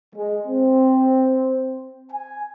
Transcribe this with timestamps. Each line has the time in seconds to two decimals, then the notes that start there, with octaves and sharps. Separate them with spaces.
0.15 G#3
0.47 C4
2.11 G#5